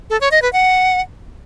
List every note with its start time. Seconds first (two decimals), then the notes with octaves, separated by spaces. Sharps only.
0.10 A4
0.21 C#5
0.31 D#5
0.42 B4
0.53 F#5